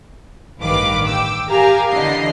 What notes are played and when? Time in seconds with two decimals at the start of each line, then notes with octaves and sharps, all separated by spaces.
0.60 A1 G2 D#3 B4 F5 D6
1.08 G5 D6 E6
1.49 G4 A#4 F5 G#5 A#5
1.89 D3 E3 D4 D#5 C7